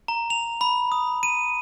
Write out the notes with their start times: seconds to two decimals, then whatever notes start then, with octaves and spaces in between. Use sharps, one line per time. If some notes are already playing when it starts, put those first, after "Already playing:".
0.08 A#5
0.30 F7
0.61 B5
0.92 D#6
1.23 D#7